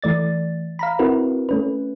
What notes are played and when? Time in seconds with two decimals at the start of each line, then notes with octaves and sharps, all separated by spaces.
0.02 E3 A3 D5 A6
0.79 F5 A#5 B5
0.99 C4 E4 F#4 A#4 B4
1.49 A3 C#4 B4